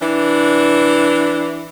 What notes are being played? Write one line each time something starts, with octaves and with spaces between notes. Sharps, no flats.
E3 D4